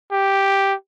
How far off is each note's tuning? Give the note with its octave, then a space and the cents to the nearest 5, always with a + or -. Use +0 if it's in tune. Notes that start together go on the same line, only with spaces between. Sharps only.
G4 +0